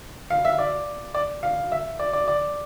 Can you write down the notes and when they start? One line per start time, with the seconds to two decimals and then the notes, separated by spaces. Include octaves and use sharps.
0.30 F5
0.45 E5
0.58 D5
1.14 D5
1.43 F5
1.72 E5
1.99 D5
2.13 D5
2.28 D5